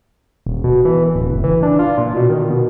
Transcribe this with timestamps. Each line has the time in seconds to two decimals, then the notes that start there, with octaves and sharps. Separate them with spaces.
0.46 D#1
0.64 B2
0.85 E3
1.15 D1
1.30 F#1
1.44 E3
1.63 D4
1.79 F4
1.98 A#2
2.16 B2
2.29 D#3
2.50 B2